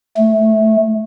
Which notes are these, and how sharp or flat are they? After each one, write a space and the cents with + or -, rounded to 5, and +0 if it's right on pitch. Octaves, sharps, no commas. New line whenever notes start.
A3 -10